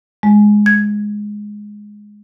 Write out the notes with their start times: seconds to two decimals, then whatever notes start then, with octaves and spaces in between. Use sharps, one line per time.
0.23 G#3
0.66 G#6